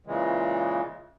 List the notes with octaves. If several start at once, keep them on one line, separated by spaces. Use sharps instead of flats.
A#2 C#3 E3 G#3